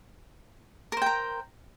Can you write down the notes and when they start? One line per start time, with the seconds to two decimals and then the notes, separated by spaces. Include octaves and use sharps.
0.92 A#4
0.97 C5
1.02 G5
1.06 A#5